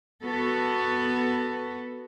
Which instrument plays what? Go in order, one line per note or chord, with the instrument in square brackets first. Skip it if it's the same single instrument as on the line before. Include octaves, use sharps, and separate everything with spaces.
[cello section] B3 F#4 A4